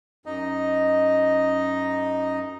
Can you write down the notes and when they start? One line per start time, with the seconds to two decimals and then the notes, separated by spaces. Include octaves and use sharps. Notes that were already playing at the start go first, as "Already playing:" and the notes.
0.26 F#2 D#4 D#5